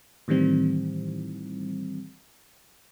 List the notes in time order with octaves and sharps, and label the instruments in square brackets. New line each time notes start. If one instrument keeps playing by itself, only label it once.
[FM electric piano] A2 D#3 E3 G3 C4